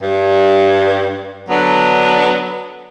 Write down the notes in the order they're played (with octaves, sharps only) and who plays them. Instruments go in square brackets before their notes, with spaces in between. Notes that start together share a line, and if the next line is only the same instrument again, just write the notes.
[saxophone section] G2
D3 F#3 B3 D4